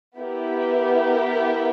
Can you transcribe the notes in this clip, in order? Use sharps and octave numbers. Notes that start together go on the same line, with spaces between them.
B3 E4 G4 A#4